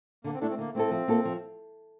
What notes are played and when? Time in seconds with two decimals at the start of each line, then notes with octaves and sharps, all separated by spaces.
0.24 D3 A#3
0.33 C4
0.41 A3 D4 E4 A4
0.49 C4
0.58 D3 A#3
0.75 A3 C4 E4 A4
0.91 F3
1.08 A#3 F4 A4
1.25 F3